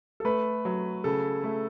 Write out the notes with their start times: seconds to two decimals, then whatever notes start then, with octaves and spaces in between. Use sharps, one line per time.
0.20 A4
0.25 A3 B4
0.65 F#3
1.04 C#3 A4
1.44 A3